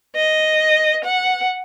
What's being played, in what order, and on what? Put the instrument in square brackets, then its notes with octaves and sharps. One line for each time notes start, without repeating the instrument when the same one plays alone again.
[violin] D#5
F#5